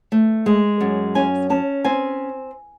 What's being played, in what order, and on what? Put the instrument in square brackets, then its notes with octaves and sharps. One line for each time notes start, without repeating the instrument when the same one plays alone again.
[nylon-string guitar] A3
G#3
F#2
C#4 G#5
C#4 A5
C4 G#5